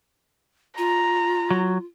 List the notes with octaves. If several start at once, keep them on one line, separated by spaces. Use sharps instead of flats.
F4 A#5
F#3